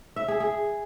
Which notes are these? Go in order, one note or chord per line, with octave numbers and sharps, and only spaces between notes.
E5
G#4
G#4